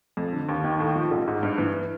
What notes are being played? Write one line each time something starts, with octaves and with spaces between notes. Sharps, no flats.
F2
D3
D#2
D#3
A2
F3
A1
G#2
G2
E3